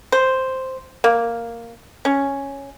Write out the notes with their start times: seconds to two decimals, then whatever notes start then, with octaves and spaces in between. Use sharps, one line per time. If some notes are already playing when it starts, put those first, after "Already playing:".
0.12 C5
1.04 A#3
2.05 C#4